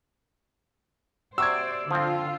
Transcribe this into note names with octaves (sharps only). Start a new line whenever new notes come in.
C3 F#4 C5 D5 E6 G#6
D3 F3 C4 F4